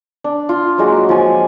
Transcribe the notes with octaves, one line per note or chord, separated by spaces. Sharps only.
D4
F4
F#3 G#3 A#3 F#4
F3 G#5